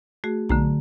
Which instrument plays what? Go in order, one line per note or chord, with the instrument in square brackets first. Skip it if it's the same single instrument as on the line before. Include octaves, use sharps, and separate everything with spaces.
[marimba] A3 F#4 G#4
[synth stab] B1 [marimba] D3 A3 A#5